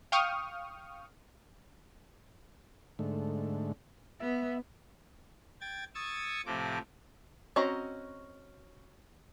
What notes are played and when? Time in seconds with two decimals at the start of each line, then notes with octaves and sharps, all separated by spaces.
0.12 F5 G5 C#6 D#6 F6
2.99 G#2 D3 A3
4.20 B3 E5
5.61 G5 G#6 A6
5.95 C#6 D#6 E6 G#6 A6
6.46 A2 C3 F3 C4 D6
7.56 C4 C#4 F#4 D#5 A#5